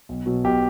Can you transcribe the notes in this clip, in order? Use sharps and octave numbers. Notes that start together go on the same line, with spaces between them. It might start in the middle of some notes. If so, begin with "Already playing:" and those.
B1
B2 F#3
B1 G4